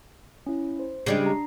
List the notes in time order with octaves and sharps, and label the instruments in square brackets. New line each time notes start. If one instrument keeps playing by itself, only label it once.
[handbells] C#4 E4
C5
[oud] C#3 G3 G#3 [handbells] D4 C7
[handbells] A#5